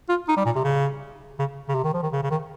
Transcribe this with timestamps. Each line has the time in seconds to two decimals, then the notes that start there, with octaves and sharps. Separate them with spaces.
0.09 F4
0.28 D#4
0.37 G3
0.46 A#2
0.56 C3
0.64 C#3
1.39 C#3
1.69 C#3
1.75 C3
1.84 D#3
1.94 F3
2.03 D#3
2.13 C#3
2.23 C#3
2.31 D#3